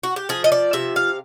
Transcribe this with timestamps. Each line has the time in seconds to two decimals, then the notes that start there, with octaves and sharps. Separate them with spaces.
0.04 F#4
0.16 G4
0.29 F3 G#4
0.44 D#5
0.52 D5
0.73 C3 E5
0.96 F5